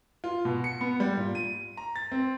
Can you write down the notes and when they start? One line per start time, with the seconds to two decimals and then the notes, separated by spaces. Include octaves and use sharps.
0.24 F4
0.45 B2
0.64 C#7
0.81 B3
1.00 G3
1.17 A#2
1.35 D#7
1.77 A#5
1.96 A6
2.12 C4